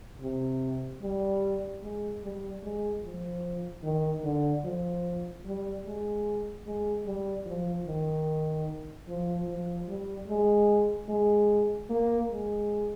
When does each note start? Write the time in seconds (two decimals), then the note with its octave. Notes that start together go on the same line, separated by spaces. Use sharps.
0.21 C3
1.02 G3
1.83 G#3
2.23 G3
2.63 G#3
3.03 F3
3.84 D#3
4.24 D3
4.65 F3
5.46 G3
5.86 G#3
6.66 G#3
7.06 G3
7.46 F3
7.87 D#3
9.08 F3
9.48 F3
9.89 G3
10.28 G#3
11.09 G#3
11.90 A#3
12.30 G#3